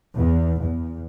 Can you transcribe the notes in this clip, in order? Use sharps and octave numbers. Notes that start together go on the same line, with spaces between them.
E2
E2